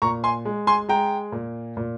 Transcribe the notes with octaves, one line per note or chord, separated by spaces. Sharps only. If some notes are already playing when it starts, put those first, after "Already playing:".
A#2 A#5 C#6
G#5 C6
G#3
G#5 C6
G#3 G5 A#5
A#2
A#2